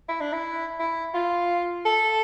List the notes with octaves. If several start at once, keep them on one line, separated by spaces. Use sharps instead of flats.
E4
D4
E4
E4
F4
A4